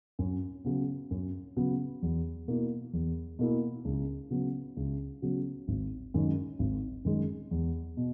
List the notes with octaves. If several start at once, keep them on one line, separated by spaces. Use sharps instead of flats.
F#2
C#3 F#3 B3
F#2
C#3 F#3 B3
E2
B2 A#3 E4
E2
B2 A#3 E4
C#2
C#3 F#3 B3
C#2
C#3 F#3 B3
G#1
F#2 D#3 G#3
G#1
F#2 D#3 G#3
E2
B2